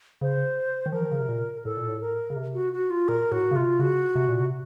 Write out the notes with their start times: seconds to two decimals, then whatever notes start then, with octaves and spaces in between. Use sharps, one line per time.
0.21 C#3 C5
0.86 D#3
0.92 F3 A#4
1.02 D#3
1.11 C#3
1.20 C3
1.29 A#2
1.65 A2 A4
1.77 A#2
1.88 A2
2.01 A#4
2.30 C#3
2.36 C3
2.54 F#4
2.73 F#4
2.90 F4
3.08 A#2 A#4
3.32 A2 F#4
3.51 C#3
3.56 C3 F4
3.79 C#3 F#4
4.15 C3
4.29 A#2
4.40 C3